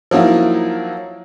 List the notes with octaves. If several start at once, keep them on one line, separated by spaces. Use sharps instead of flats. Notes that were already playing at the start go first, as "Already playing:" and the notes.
F3 F#3 A#3 D#4 E4